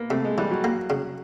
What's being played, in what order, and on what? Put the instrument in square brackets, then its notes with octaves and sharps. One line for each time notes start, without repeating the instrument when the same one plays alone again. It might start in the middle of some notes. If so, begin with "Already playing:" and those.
Already playing: [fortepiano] A#3 B3
[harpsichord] C3 [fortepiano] A3
[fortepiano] G#3
[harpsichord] E3 [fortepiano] G3
[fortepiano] F#3
[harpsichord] A#3
C#3